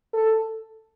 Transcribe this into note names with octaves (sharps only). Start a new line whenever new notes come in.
A4